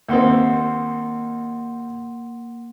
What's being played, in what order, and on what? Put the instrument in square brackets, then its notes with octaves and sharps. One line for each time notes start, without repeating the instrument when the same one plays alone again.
[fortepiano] D#2 C4 [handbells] A#3 F#5 C6